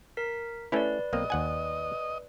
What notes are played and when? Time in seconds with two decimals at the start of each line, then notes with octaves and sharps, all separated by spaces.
0.17 A#4 B6
0.72 A3 C#4 E4 B4 D5
1.13 B1 A#3 C4 D#5
1.30 D#2 F#5 G#5